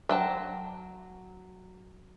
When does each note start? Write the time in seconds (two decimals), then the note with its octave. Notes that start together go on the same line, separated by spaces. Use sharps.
0.09 F#3 G5 A5